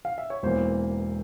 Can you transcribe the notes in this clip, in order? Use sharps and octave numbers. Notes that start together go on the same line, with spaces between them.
F5
E5
C#5
E1 E2 E3 A#3 C5